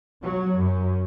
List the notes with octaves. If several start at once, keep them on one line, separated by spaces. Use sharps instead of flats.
F#3
F#2